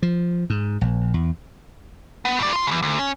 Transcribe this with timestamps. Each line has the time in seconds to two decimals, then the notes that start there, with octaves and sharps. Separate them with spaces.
0.02 F3
0.50 G#2
0.81 A#1
1.14 E2
2.25 B3
2.39 A2 D5
2.53 F4 C6
2.67 E2 C#3
2.83 D2
2.99 C#4